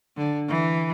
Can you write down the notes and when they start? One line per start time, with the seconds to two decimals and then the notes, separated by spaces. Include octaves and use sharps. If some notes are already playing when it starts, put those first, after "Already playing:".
0.17 D3
0.49 E3